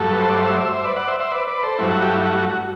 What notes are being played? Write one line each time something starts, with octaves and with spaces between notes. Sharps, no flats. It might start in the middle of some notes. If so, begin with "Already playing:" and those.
Already playing: G2 F#3 A3 A4
B4
C5
D5
C5 E5
D5
C5 E5
C5
B4 D5
D5 F#5
C5 E5
C5 E5
B4 D5
B4 D5
A4 C5
G2 F#3 A3 E4
F#4
E4 G4
E4
F#4
F#4
F#4